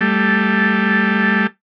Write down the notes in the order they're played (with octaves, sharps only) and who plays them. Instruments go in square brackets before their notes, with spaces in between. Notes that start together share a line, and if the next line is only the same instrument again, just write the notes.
[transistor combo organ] G3 A3